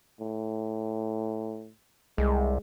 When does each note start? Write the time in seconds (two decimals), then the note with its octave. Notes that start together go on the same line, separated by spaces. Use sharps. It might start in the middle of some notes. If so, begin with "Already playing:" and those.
0.20 A2
2.18 C2 G#3